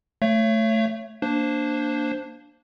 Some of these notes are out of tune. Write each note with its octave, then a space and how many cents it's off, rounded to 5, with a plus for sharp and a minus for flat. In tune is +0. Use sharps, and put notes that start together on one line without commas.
A3 +0 C#5 +0 E5 +40
A#3 +0 D4 +0 C5 +0